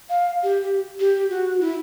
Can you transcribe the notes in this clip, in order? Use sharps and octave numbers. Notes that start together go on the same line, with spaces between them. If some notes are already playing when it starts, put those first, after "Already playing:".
F5
G4
G4
F#4
E4